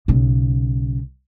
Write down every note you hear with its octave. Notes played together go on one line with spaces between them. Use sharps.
B1 C#3